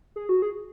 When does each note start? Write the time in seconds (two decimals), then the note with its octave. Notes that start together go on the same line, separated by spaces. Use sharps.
0.16 G#4
0.29 F#4
0.42 G#4